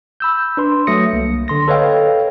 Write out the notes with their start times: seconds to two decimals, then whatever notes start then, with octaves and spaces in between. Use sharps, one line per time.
0.20 B5 E6 G6
0.57 D4 B4 C6
0.87 F#3 A3 D#6 A#6 C#7
1.13 C2 A#3
1.48 D3 C6 A#6
1.68 A4 B4 C#5 D#5 F5 G5